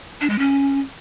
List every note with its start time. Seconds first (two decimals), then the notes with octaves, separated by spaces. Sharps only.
0.21 D4
0.30 G#3
0.39 C#4